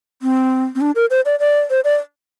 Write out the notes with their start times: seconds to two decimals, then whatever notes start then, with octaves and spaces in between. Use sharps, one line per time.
0.22 C4
0.75 C4
0.81 D4
0.95 A#4
1.10 C5
1.25 D5
1.40 D5
1.70 C5
1.84 D5